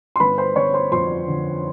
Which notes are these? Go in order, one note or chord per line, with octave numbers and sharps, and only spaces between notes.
C6
G1 B4 B5
C5 C6
G1 C#5 C#6
C5 C6
F2 C5 C6
D3